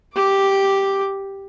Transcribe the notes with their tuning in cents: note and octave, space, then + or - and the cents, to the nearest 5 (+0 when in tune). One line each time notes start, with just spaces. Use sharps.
G4 +0 D6 +0